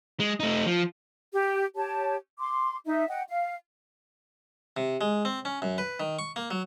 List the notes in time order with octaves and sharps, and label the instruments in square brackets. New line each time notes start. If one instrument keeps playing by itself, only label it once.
[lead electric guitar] G#3
A3 D#4
F3
[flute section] G4
G4 C#5 A5
C6 D6
D#4 E5
D#5 F#5 G5
F5
[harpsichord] C3
G#3
C4
C#4
F#2
B4
D#3
C#6
A#3
F#3